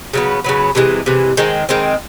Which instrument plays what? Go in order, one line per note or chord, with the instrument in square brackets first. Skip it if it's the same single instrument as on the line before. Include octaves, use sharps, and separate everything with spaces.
[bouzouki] C#3 F#3 B3
C#3 F#3 B3
C3 E3 G#3
C3 E3 G#3
D#3 G#3 C4
D#3 G#3 C4